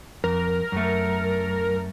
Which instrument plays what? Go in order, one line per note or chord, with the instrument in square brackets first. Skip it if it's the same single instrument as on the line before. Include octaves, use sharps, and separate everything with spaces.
[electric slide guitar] F2 [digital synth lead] A#4
[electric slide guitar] F#2 A3